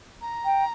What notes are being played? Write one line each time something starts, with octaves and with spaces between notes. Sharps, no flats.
A#5
G5